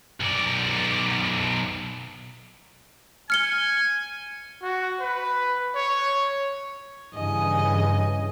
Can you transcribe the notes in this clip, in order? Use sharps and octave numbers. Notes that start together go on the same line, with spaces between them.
B1 D5
G#5 F6 C#7 G7
F#4
B4
C#5
G2 C#3 E3 D#5 G#5